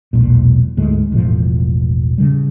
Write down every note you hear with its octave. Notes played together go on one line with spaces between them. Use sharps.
E1 B1 A#2
D2 G#2 G#3 A3
E1 A1 A2 F3
C#3 G3